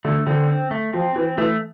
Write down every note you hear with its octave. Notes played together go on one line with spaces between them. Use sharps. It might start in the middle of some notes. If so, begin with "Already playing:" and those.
D3 A3
D3 C4
C4
A3
F3 C4
E3 C4
E3 A3